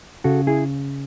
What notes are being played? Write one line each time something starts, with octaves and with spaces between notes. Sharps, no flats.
C#3 F#4 A4
E4 G#4